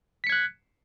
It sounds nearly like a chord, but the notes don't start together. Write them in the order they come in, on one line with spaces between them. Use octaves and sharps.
B6 C#7 G#6 F#6